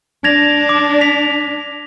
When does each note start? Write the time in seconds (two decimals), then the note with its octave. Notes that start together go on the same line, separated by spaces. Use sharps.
0.24 D4 G#6 A#6 F7
0.69 D6
1.01 B6 F7